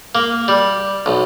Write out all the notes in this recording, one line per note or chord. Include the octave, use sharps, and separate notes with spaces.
A#3
G3
B1